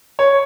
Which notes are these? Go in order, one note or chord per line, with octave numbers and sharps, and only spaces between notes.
C#5